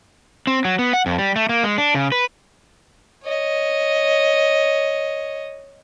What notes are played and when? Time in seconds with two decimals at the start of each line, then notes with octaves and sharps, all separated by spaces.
0.47 C4
0.65 F#3
0.79 B3
0.93 F#5
1.06 F2
1.18 G3
1.36 A3
1.49 A#3
1.63 G#3
1.78 D4
1.95 C#3
2.12 B4
3.23 C#5 D#5